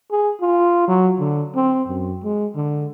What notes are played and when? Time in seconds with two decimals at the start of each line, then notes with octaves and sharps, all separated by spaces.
0.11 G#4
0.41 F4
0.88 F#3
1.19 D3
1.55 C4
1.88 F#2
2.24 G#3
2.55 D3